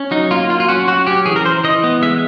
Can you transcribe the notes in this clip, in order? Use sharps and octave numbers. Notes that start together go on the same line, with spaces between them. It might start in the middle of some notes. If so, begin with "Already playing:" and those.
Already playing: C#4
F#3 D#4
A#3 F4
F#3 F4
F4
C#4 F#4
F#3 F#4
C#4 G4
E3 G#4
A#4
E3 C5
E3 D#5
B3
G#3 E5